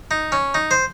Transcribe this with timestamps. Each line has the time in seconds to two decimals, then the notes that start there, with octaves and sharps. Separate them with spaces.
0.11 D#4
0.32 C#4
0.54 D#4
0.71 C5